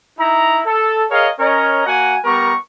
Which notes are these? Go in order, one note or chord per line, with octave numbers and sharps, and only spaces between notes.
D#4 E4 A#5
A4
G#4 A#4 C#5 D#5 F5
C#4 A#4 C#5 D#5 A#5
A#3 F#4 F#5 G#5
G3 B3 A#4 A#5 C#6